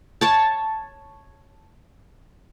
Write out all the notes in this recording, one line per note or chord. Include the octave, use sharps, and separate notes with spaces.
C#5 A5